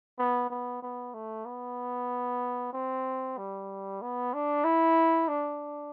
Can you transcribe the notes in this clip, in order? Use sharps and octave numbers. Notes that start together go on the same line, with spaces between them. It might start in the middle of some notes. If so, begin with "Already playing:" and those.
B3
B3
B3
A3
B3
C4
G3
B3
D4
E4
D4